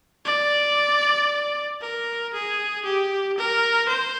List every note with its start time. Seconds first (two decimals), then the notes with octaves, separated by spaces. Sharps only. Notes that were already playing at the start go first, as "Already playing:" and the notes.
0.25 D5
1.81 A#4
2.33 G#4
2.84 G4
3.37 A#4
3.88 C5